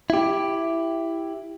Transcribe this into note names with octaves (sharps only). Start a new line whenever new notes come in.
E4 G4